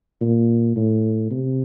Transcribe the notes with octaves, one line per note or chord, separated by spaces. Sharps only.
A#2
A2
C3